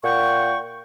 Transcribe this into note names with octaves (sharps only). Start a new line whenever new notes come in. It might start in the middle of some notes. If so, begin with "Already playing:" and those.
A#2 F#5 G5 C#6